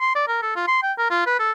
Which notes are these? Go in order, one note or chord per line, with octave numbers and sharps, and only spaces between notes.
C6
D5
A#4
A4
F4
C6
G5
A#4
F4
B4
A4